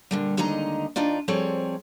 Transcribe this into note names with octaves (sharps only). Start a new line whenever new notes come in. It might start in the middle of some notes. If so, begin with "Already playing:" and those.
A#2 D3 G3
D#2 D3 G#3 D#4 D#5 A#5
D2 D4 D#4 F4 D5
F3 G3 C4 G#4 A4 C#5